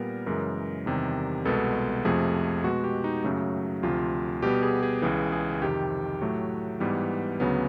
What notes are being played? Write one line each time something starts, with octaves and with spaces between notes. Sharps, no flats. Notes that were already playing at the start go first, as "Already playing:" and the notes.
Already playing: A#2 G3 B3 A#4
F#2 C#3 E3 G#3 A#4
E2 C3 D#3 G3
C2 B2 G#3 B3 A4
F2 C3 F3 A3 G#4
B2 G#3 B3 F#4
G4
D#4
F#2 C#3 F#3 A3
D2 C3 F3 F4
B2 G3 B3 G4
G#4
G#4
C#2 C#3 E3 G#4
G#4
F2 C3 D#3 G4
A2 F#3 A3
G#2 E3 G3 B3
D2 C#3 F#3 B3